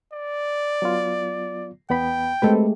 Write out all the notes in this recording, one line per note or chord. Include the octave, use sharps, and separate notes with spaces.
D5
F#3 B3 F4
E2 B3 G5 B5
G#3 A3 C4 G4 A4 B4